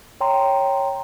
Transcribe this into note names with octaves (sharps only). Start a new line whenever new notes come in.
C#5 G5 A#5 C6